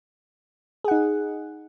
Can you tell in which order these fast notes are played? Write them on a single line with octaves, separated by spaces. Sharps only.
G#4 F#5 D#4